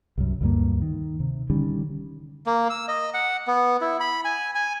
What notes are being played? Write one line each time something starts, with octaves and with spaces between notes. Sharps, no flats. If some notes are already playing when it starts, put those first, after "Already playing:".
C2 F#2
D2 G2 A#3
D#3
C3
D3 D#3 G3 C#4
A#3
E6
D#5
F#5
B3
E4
B5
G#5
G#5